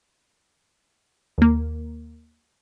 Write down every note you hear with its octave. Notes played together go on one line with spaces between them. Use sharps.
D#2 A#3